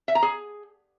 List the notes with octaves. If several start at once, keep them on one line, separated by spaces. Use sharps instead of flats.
E5
A#5
G#4